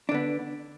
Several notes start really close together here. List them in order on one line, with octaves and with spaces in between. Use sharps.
D4 D3 B3